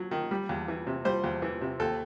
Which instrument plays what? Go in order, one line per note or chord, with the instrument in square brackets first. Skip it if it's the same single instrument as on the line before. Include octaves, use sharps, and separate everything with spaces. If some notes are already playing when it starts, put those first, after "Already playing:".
Already playing: [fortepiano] F#3
D#3
G3
E2
E3
C3
G3 C5
E2
E3
C3
D#2 A4